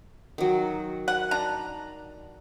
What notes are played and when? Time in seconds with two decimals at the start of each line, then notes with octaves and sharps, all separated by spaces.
0.38 D#3 F#3
1.08 F#5
1.31 D4 A#5